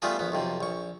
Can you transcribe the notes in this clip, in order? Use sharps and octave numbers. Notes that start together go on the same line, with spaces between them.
G3 A3 B3 F4 G#4 A4
A#1 B3
B1 F2 C3
A#1 C#6